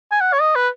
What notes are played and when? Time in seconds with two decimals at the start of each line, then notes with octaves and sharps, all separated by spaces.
0.11 G#5
0.21 F#5
0.33 C#5
0.41 D#5
0.55 B4